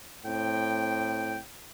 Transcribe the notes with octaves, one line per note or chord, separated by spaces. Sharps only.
A2 C4 G5